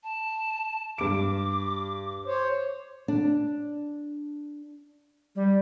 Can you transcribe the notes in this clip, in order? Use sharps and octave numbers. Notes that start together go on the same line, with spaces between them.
A5
G2 D6 D7
C5 C#5
D4
G3